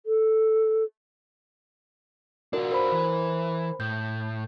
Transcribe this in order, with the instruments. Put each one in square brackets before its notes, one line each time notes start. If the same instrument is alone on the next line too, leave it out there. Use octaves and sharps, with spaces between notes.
[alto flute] A4
[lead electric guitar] D4 F4 [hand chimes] F#4 A#4 D5
[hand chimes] A#4 C5 B5
[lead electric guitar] E3
[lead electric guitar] A2 [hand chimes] G6